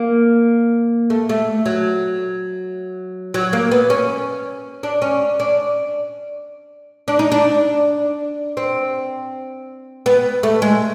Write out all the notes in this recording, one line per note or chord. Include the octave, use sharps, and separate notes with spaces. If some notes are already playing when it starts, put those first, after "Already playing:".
Already playing: A#3
A3
A3
F#3
F#3
A#3
B3
C#4
D4
C#4
D4
D4
D#4
D4
C4
B3
A3
G#3